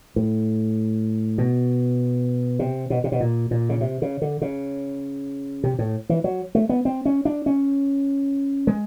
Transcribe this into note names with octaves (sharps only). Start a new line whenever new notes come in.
A2
B2
C3
B2
C3
B2
A#2
A#2
C#3
C3
C#3
D3
C#3
C3
A2
E3
F#3
A3
B3
C4
C#4
D4
C#4
G#3